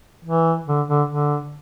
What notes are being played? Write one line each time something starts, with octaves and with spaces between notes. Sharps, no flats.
E3
D3
D3
D3